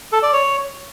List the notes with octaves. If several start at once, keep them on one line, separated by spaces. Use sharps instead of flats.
A4
D5
C#5